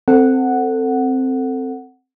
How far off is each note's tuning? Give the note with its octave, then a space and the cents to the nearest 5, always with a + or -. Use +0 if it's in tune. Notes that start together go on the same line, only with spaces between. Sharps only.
C4 +0 A4 +25 F#5 +0